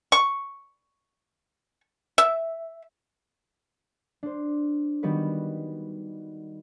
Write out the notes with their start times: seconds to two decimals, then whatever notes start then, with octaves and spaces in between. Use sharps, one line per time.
0.12 C#6
2.18 E5
4.23 D4 C5
5.03 D#3 G3 B3 F#4 B4